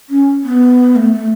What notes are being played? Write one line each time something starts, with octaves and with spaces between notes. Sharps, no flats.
C#4
B3
A3
A3